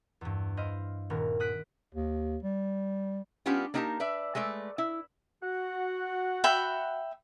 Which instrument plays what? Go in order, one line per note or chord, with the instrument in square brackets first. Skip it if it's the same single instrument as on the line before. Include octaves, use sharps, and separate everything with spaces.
[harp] E2 G2
E4 C5 D#5 F5
D#1 B3 A#4
D#6 F#6 B6 D7
[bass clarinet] D#2
G3
[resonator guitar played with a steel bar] G3 B3 C#4 D4 F4 G4
A#3 D4 D#4 G4 A#4 A5
B4 D5 E5
G#3 A3 B4 D5
E4
[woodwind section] F#4 F#5
[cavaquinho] E5 G5 B5